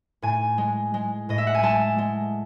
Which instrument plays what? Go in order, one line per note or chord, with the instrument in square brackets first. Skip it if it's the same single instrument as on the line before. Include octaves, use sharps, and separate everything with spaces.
[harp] A2 G#5
G#3
G#3
A2 D#5
E5
F#5
G#5
G#3 A5
G#3